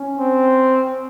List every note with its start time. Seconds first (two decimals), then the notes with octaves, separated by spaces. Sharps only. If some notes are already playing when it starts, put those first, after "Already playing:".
Already playing: C#4
0.19 C4